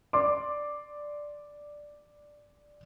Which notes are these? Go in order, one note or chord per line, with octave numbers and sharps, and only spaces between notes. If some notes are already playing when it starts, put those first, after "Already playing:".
D5 C6 D6